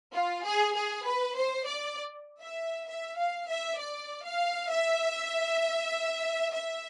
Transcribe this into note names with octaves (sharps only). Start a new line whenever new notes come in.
F4
G#4
G#4
B4
C5
D5
E5
E5
F5
E5
D5
F5
E5
E5